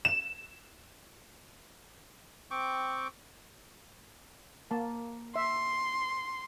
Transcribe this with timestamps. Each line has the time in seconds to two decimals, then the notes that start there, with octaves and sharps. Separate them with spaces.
0.05 E7
2.51 C4 G5 C#6 D6
4.71 A#3 A5
5.36 E5 C6